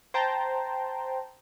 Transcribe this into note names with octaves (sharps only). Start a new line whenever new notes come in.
C5 G5 A5 A#5